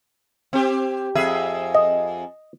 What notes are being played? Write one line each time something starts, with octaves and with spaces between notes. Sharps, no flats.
C4 G4
F2 G#4 E5
D#5